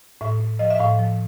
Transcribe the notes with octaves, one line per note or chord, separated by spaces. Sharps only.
A2 E5
A2
F3 D#5
E5
A2 F5
F3